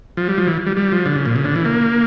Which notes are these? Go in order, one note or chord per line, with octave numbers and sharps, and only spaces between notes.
F3
G3
F3
E3
G3
G3
F3
D3
C#3
A#2
C#3
D3
E3
A#3